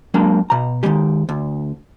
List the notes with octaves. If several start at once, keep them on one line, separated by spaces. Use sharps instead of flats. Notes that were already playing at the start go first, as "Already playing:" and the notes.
F#3 G#3 A#3 D4
B2 A#5
D#3 F#3 G#3 G4
D2